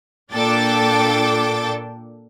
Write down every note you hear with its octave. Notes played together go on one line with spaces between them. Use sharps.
A#2 D4 A4 G5 D6 A6